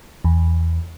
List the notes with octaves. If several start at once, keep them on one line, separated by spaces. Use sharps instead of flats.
E2